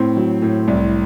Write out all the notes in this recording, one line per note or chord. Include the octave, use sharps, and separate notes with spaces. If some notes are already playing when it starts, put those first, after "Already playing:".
Already playing: A2 C4
F#3
A2
C2